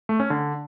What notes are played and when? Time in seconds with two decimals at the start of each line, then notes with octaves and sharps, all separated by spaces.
0.09 A3
0.20 C#4
0.30 D3